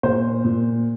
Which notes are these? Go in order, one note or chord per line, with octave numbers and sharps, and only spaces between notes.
A#2 C5
A#2